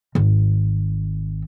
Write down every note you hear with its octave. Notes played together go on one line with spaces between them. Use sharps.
G#1